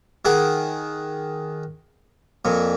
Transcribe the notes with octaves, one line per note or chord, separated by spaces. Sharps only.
D#3 G#4 F#5 D6
F2 A#2